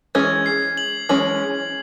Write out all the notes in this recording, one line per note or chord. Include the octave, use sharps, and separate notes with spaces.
E3 G#3 C#4 G#6
C7
F#7
E3 G#3 C#4 F#7